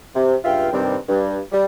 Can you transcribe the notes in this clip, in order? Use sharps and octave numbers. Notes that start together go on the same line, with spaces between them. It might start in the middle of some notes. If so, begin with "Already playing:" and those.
C3
C#2 G2 F4 E5 F5 G5
G2 C3 D#3 G3 C4
G2
G3